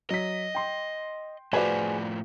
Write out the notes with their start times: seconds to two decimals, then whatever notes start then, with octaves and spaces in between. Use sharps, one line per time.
0.10 F#3 D#5 B6
0.55 G5 C6
1.53 A2 F3 F#4 G#4 B4 C5 D5 G#5